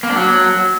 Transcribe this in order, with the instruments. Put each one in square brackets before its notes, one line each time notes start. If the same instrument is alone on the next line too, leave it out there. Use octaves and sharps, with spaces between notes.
[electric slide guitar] A#3
D4
F#3